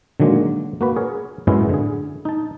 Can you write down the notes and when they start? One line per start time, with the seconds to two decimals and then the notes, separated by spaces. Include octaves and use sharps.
0.20 D3 D#3 F#3 G#3 A#3
0.81 A#3 F#4 B4
0.96 G#4 A#4 C#5
1.47 F#2 A2 G#3 B3 C#4 E4
1.69 D3 G#4
2.25 D#4 A5